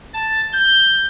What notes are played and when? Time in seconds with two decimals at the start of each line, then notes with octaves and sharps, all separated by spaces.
0.14 A5
0.53 G6